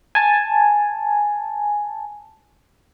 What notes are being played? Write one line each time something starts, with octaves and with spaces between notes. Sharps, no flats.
G#5 A5